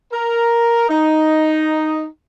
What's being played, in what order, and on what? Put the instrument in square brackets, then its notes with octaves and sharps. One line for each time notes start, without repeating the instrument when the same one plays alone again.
[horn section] A#4
D#4